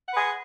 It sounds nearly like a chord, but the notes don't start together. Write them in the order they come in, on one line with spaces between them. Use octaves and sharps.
F#5 B4 G#4